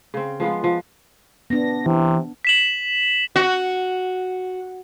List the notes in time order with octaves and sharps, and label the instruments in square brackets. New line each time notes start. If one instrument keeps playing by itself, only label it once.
[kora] C#3 C4
F3 G#3 B3 F4
F3
[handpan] B3 D4 [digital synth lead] A#6
[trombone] C3 [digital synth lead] E3
[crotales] B6 E7 F#7
[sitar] F#4